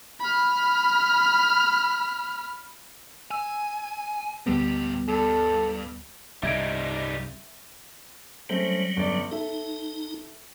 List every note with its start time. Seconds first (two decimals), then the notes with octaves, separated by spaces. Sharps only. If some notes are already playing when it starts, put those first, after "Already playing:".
0.20 B5 F6
3.31 G#5 E6
4.46 D2 A2 G3 B3 G4
5.08 G2 A4
6.43 C2 G2 C#3 G3 D#4 E5 G#6 D7
8.49 F#3 G3 A3 C4 C#4
8.97 G1 C#4 D5
9.31 D#4 A4 E5